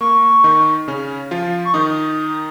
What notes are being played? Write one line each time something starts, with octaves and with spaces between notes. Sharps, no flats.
A#3 C#6
D#3 D#4
C#3 C#4
F3 F4
C#6
D#3 D#4 D#6